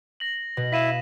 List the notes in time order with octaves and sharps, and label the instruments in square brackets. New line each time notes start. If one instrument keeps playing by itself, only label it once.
[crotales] A#6 F#7
[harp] B2
[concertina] E4 [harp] F5 [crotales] B6 D#7 E7